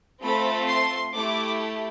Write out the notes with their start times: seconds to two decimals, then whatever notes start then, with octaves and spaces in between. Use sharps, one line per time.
0.23 A3 C4 F4 A4 B5
0.69 C6
1.14 A3 E4 G4 D6